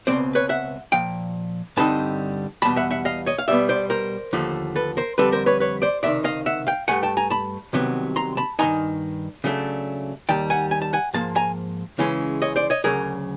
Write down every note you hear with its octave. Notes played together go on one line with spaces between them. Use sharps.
C#2 B2 G#3 C4 C5 D5
B4 C#5
E5 F#5
A#2 F3 F5 G5
G2 D3 G3 C4 D#4 A5 B5
E2 B2 G3 A5 B5
E5 F#5
E5 F#5
D#5 F5
C#5 D#5
F5
B2 G3 B3 D5 E5
C5 D5
A#4 C5
D#2 D3 F3 A3
A4 B4
A#4 C5
F2 D3 G3 C4 A4 B4
A#4 C5
B4 C#5
B4 C#5
C5 D5
C#2 C3 D#3 D5 E5
D#5 F5
E5 F#5
F5 G5
G2 E3 A3 F#5 G#5
G5 A5
G#5 A#5
A5 B5
C2 C3 D#3 F#3 B3
A#5 C6
A5 B5
G2 D#3 G#3 C4 D#4 G#5 A#5
C#3 F#3 A3 D4
D#2 D#3 G3 G5 A5
F#5 G#5
G#5
A5
F#5 G#5
G#2 F3 A#3 A5
G#5 A#5
C#3 E3 G#3 C#4
C#5 D#5
C5 D5
C#5 D#5
D2 C#3 F#3 G#4 A#4